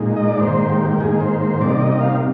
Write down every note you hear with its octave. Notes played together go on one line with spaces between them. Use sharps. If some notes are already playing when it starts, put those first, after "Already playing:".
Already playing: A#2 G#3 D#4
D#5
D5
G#2 D#3 A#3 C5
G4
G4
G#2 D#3 A#3 G#4
C5
C5
C3 G3 A#3 D#4 D5
D#5
D#5
F5